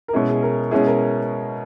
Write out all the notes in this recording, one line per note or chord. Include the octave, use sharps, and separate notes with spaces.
A#4
B2 G#3 C#4 E4 G#4
G#4
A#4
B2 G#3 C#4 E4 G#4
A#4